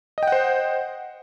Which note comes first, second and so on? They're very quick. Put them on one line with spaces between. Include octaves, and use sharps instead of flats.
D#5 G5 F#5 C5